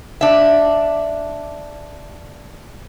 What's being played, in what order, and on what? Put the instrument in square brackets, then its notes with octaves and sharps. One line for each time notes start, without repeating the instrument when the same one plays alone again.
[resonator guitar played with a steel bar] D4 E5